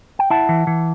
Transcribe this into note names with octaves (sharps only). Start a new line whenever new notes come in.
G5
E4 F#5 A5
E3
E3